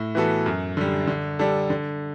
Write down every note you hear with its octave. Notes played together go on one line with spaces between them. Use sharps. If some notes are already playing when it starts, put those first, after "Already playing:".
Already playing: A2
E3 B3 F#4 A4
F#2
D3 G3
D3
G3 D4 A4
D3